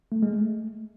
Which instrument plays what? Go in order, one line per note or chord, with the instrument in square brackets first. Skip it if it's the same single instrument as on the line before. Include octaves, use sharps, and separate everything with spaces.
[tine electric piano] A3
G#3
A3